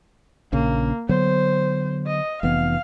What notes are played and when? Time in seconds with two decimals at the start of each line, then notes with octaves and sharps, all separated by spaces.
0.52 A#1 C#3 A#3
1.09 D3 F#3 B3 C5
2.07 D#5
2.43 F1 E3 B3 F5